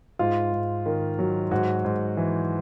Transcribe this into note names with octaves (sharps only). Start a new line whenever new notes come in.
G#2 F4
G#2
D#3
F#3
G#2 F#4
G#2
E3